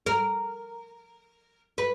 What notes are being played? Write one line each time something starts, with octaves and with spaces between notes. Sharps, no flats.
A#4
B4